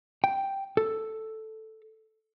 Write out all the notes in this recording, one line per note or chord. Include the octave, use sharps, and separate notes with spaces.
G5
A4